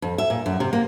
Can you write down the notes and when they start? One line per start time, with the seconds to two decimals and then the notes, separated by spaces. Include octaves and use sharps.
0.02 F2
0.18 E5
0.30 A#2
0.46 F#2
0.60 C3
0.73 A#3